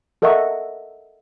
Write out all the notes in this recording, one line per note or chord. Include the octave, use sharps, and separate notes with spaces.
A4 A#4 D#5 E5 F#5 C#6